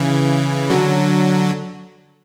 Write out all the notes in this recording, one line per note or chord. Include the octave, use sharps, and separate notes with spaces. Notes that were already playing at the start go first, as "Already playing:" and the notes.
Already playing: C#3 E3
D3 F#3